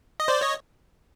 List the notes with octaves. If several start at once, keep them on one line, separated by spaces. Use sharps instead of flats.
D#5
C5 D5
C#5 D#5